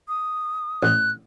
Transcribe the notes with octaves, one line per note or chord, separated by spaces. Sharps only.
D#6
A1 F#6